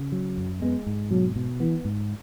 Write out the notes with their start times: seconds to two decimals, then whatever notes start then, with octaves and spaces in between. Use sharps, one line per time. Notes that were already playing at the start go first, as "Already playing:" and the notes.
Already playing: C#3
0.12 F#3
0.37 F#2
0.62 G#3 B3
0.87 G#2
1.11 B2 F#3
1.36 B2
1.60 E3 B3
1.85 G#2